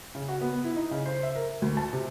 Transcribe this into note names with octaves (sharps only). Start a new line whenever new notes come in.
C#3
F#4
B3
E4
D#4
C#3
C5
E5
A#4
D2
A5
C3